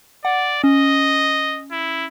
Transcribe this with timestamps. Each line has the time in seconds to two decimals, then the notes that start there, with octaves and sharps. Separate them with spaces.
0.25 D5 F#5
0.64 C#4 D#5
1.72 E4